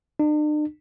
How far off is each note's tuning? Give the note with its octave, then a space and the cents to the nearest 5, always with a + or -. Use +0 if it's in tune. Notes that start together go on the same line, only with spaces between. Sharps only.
D4 +45